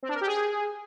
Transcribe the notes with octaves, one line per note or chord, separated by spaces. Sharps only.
C4
D4
A#4
G4
G#4